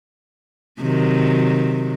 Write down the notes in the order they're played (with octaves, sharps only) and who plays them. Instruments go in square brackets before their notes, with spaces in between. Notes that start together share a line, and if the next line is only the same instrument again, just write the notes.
[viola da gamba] C3 D#3 F#3